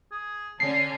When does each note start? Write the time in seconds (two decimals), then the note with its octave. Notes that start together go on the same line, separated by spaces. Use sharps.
0.11 G#4
0.60 D3 C#4 A5 C7